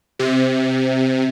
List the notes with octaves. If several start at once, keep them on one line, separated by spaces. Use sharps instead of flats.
C3